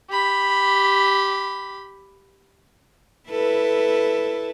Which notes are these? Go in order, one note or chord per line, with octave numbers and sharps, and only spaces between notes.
G4 B5
E4 A4 B4